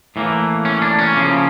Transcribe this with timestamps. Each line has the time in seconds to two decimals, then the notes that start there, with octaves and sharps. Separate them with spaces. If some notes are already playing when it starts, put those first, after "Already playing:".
0.16 A2 E3 A#3
0.65 C#4
0.82 D4
0.99 C#4
1.15 C#3 F3 A#3